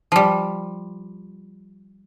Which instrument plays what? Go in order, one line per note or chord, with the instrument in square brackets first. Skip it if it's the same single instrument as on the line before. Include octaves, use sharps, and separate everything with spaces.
[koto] F3 G3